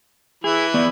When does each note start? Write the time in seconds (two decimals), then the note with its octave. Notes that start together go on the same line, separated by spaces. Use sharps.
0.44 E3 E4 G#4
0.74 E2 B3 D5